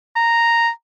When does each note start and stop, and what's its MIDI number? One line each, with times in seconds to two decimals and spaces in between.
0.16 0.69 82